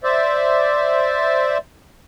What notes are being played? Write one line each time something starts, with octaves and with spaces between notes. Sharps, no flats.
C5 D5 E5